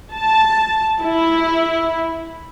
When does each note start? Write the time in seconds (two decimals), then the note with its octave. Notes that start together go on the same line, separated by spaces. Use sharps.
0.13 A5
1.02 E4